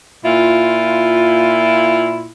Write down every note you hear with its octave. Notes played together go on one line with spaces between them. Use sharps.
A#2 E4 F4